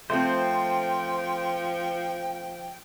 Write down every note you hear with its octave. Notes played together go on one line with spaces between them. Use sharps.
F3 A3 C4 C5 G5